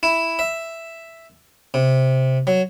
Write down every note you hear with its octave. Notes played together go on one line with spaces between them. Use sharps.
E4
E5
C3
F#3